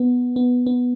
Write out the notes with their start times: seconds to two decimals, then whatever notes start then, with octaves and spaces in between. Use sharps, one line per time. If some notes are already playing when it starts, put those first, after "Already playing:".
Already playing: B3
0.36 B3
0.67 B3